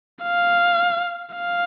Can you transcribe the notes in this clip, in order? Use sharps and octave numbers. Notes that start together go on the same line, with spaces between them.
F5
F5